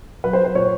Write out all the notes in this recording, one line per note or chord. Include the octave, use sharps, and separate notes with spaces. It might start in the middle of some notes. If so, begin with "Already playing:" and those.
F#3 B4
C5
F#3
C5
A#2 C#5